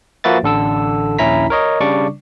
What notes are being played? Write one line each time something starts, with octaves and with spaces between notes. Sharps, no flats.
F3 A#3 F#4 B4 E5 A6
A1 D3 A4 E6
A#1 D#2 C#4 E4 A#5 B6
A#4 C#5 D#5
C#3 G3 D4 D5 C#6 D6